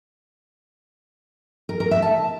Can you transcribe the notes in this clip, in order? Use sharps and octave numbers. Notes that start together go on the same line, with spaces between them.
A#4
A#4
E5
A5